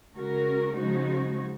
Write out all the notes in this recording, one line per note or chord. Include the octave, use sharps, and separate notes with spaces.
C#3 G#3 C#4 F#4 A#4
C#3 F3 G#3 D#4 F#4